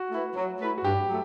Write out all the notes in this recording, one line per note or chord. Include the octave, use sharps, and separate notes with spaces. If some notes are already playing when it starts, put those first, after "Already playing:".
Already playing: F#4
A3 E4 B4
F#3
A3 E4 B4
F#4
G2 G4
F#3 A3